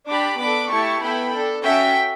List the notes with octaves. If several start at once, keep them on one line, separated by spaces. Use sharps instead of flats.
D4 G4 B5 D6
B3 D4 A4 B5 D6
A3 E4 G4 A5 C#6
B3 E4 A4 G5 B5
D4 A4
C#4 F#4 A4 E5 G5